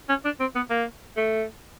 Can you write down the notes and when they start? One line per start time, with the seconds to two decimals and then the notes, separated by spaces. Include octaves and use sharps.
0.09 C#4
0.25 D4
0.40 C4
0.55 B3
0.70 A#3
1.17 A3